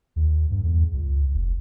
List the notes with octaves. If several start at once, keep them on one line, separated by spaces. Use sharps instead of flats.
D#2
G2
E2
C#2
F1